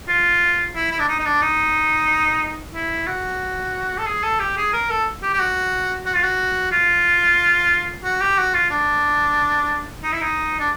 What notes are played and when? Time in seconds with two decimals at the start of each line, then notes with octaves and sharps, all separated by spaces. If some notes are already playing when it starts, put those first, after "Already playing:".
0.08 F4
0.75 E4
0.91 E4
1.00 D4
1.09 D#4
1.20 D#4
1.25 D4
1.42 D#4
2.74 E4
3.07 F#4
3.98 A4
4.06 G#4
4.23 A4
4.40 G4
4.57 G#4
4.73 A#4
4.90 A4
5.23 G4
5.33 G4
5.39 F#4
6.06 F#4
6.14 F4
6.23 F#4
6.72 F4
8.04 F#4
8.21 G4
8.38 F#4
8.54 F4
8.70 D4
10.03 D#4
10.13 E4
10.21 D#4
10.60 D4